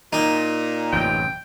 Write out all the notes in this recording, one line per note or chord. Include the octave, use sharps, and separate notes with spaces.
A#2 D#4
A1 F#2 C3 G5